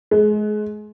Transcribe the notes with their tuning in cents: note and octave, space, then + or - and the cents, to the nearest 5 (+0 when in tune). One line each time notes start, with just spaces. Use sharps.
G#3 +30